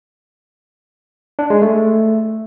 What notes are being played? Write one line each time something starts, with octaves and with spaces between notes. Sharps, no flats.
D4
G#3
A3